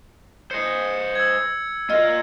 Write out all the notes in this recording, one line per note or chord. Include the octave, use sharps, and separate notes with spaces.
C5 D#5 C#7
E6 G#6
F4 A#4 D#5